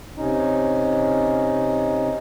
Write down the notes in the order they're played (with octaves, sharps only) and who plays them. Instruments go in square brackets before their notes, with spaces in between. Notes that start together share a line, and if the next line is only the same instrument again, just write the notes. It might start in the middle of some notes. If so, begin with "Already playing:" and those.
[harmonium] C3 C#4 D#4